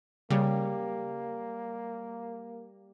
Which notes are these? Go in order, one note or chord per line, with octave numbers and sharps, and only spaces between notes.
C#3 G3 A#3